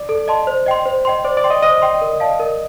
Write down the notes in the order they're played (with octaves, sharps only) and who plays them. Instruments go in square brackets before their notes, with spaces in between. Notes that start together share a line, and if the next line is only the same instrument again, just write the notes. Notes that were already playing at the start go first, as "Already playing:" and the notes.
Already playing: [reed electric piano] D5
[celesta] A4
D#5 A5 C6
C5
D#5 G5 C6
C5
D#5 G5 C6
[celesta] C5 [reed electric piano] D5
[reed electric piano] D5
[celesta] G5 C6
[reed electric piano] D#5
[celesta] C5 [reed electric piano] D#5
[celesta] G5 C6
A#4
D5 F5 A5
A#4